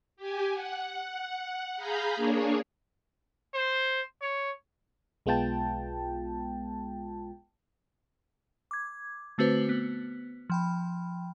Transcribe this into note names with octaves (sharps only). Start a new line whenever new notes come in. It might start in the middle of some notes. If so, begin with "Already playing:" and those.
G4 G#5
F#5
G#4 F5 A#5 B5 G6
A#3 D4 G#4 C#5
C5
C#5
B1 G#3 B3 F4 G5 A5
D6 G#6
D3 A3 C4 F#4 B4 C5
B3
F3 G5 B5